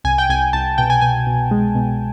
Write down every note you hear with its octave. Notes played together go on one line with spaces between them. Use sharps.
C2 G#5
G5
C2 G#5
C2 A5
B2 G5
G#5
B2 G#5
B2
G#3
B2